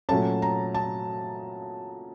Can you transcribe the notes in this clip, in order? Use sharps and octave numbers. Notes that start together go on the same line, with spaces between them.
A#2 F#3 A3 C#4 A5
A#5
A5